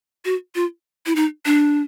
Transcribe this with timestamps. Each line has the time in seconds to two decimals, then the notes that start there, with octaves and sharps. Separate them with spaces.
0.25 F#4
0.55 F4
1.06 E4
1.16 D#4
1.45 D4